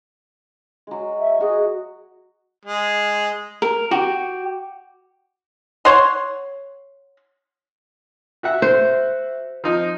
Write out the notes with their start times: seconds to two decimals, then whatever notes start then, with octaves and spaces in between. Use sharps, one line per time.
0.87 F#3 G#3
1.20 E5
1.40 F#4 G#4 D#5
2.65 G#3
3.62 A#4
3.91 F#4 G4
5.85 C#5 F#5 C6
8.43 F#4 E5 F#5
8.62 C5
9.64 F3 D#4